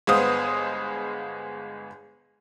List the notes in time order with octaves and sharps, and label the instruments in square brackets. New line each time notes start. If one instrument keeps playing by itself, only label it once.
[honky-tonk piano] G1 G#3 B3 C5 F5 D#6